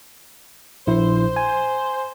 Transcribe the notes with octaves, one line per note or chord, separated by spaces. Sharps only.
A#1 E4 C5
G#5